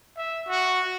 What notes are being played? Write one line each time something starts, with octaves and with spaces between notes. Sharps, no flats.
E5
F#4